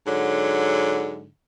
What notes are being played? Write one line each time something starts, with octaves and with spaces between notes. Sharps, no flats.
G#2 D3 F#3